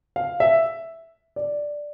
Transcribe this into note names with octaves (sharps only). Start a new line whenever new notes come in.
F5
E5
D5